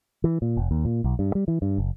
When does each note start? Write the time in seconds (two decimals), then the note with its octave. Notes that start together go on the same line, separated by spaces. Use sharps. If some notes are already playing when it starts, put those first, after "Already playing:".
0.24 E3
0.42 A#2
0.57 F1
0.71 D#2
0.85 A#2
1.04 B1
1.19 G2
1.35 G3
1.48 E3
1.62 G2
1.78 F#1